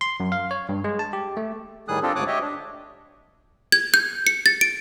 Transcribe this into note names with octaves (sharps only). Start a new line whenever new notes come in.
C6
F#2
F5
C#5
G2
G#3
A5
G4
A3
A2 D#3 G3 G#4 D#6 F#6
C4 D4 F4 G4 A4
D2 G#2 C#5 D6 D#6 F#6
G4 C#5 D#5 E5
D4
G#6
G6
C#7
A6
D7